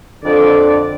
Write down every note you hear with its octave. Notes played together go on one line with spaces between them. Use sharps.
F2 D3 D5